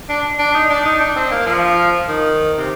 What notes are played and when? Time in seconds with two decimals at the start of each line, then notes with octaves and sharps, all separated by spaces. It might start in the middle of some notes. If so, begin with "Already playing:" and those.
0.09 D4
0.39 D4
0.54 D#4
0.70 D4
0.85 D#4
1.00 D4
1.16 C4
1.31 A#3
1.47 F3
2.08 D#3
2.58 C3